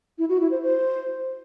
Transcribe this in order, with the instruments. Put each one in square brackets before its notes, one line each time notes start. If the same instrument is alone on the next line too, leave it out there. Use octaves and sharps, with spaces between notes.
[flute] E4
F#4
E4
C5
C5